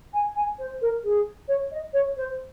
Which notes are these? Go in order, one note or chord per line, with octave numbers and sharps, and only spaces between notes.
G#5
G#5
C5
A#4
G#4
C#5
D#5
C#5
C5